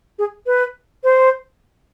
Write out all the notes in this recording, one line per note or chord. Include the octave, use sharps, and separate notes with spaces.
G#4
B4
C5